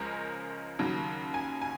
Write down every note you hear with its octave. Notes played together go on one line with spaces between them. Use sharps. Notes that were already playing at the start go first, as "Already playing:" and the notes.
Already playing: C#2 C#3 F3 G#3 C#4 A#4
D#2 C#3 F#3
G#5
G#5